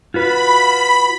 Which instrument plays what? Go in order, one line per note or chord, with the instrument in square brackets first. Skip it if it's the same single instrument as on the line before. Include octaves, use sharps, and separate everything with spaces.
[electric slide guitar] F4 F#4 B4 [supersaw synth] B5